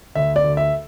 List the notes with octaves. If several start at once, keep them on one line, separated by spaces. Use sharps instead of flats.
D2 E5
D5
D2
E5